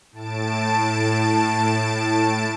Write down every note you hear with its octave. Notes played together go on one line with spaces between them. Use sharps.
A2 A5 D7